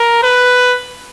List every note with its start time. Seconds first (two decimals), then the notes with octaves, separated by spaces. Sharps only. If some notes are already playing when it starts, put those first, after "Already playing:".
Already playing: A#4
0.23 B4